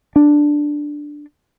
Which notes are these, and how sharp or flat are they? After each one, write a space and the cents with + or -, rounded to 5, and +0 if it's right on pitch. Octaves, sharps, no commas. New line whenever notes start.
D4 +5